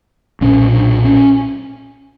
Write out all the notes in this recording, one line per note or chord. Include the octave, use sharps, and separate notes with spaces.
B1 A#2 C#4
D4
C#4